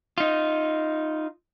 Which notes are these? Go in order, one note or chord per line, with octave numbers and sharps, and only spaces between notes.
D#4 F4